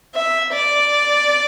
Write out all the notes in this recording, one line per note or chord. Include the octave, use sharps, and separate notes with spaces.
E5
D5